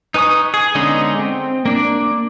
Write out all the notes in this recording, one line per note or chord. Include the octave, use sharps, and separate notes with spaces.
D#4 B4 G#5 C#6 D#6
G#4
D3 G#3 B3 C#4 D#4
C4
A#3 D4 D5